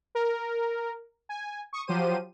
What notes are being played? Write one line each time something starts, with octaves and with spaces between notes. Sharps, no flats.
A#4
G#5
C#6 D#6
F3 F#3 G4 C5 D#7